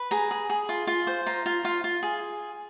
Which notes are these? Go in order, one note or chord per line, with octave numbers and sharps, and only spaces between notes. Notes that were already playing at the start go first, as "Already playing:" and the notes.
Already playing: B4
G#4 A#5
G#4
G#4
F4
F4
C5
F4 A#5
F4
F4
F4
G#4